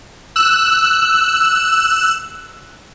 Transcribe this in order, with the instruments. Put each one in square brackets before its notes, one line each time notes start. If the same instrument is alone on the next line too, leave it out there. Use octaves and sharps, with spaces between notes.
[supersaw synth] E6 F#6